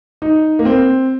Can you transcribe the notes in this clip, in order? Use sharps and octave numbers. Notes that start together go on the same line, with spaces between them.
D#4
A#3
C4